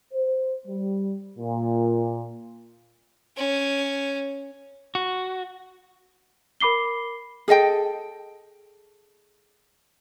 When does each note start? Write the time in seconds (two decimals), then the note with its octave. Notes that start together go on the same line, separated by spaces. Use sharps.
0.13 C5
0.67 G3
1.38 A#2
3.37 C#4
4.95 F#4
6.60 A#4 B5 D6 C7 G7
7.48 G#4 A4 D#5 G5